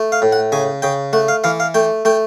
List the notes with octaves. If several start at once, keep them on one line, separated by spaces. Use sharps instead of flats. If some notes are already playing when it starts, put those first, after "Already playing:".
Already playing: A3
F5
A2
F#5
C#3 G#5
C#3 G5
A3 F#5
F5
E3 F5
F5
A3 G5
A3 G5